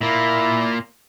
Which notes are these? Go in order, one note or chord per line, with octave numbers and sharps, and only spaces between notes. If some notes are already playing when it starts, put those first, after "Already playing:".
A#2 A#3 E4